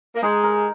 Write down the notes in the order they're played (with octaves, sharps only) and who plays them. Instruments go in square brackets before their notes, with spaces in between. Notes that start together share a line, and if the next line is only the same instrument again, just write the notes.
[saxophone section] A#3
[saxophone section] G#3 [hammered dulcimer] D#4
[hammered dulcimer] A#4